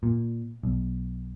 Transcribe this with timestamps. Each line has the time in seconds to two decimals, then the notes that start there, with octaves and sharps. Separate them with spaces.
0.03 A#2
0.63 B1